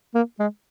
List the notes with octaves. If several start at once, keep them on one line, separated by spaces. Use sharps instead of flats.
A#3
G#3